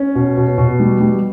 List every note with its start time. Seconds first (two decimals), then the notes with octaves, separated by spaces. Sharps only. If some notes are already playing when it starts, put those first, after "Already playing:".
Already playing: C#4
0.15 B2
0.37 B2
0.58 B2
0.80 G3
1.01 G3